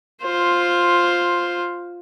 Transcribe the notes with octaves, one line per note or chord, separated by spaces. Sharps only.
F4 C5